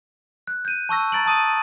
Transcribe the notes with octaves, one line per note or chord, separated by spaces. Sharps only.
F#6
G6 D#7
A5 C#6 E6 A#6
A#5 A6 D7 F#7
A5 D#6 D#7